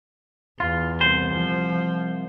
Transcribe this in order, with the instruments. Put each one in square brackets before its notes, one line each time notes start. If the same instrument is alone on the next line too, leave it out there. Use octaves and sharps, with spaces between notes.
[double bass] E2 [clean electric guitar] F4
[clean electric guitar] C2 C5
[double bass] F3